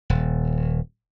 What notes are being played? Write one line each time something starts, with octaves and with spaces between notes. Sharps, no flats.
D#1